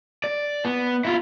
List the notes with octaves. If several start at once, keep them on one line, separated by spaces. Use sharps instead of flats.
D5
B3
E4 F4